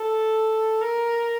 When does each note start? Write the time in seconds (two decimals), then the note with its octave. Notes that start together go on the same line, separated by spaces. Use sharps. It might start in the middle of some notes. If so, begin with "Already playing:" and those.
Already playing: A4
0.81 A#4